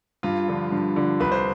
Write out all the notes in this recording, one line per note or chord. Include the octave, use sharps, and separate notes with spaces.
G2 F4
D3 F3
G2
D3 F3
C2 B4
C5